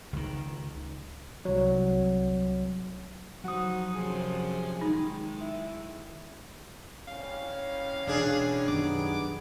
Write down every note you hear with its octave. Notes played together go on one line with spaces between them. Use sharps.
C#2 D#3
C2 F#3
F3 F#3 D#4 F#4 D#6
F#2 C3 F3 G#4
D#3 G#3 D#4
E4
C2 C#4 F5
E1 B2 D4 G#4
F#2 D#3 F#3 B3 D#4 G4 D6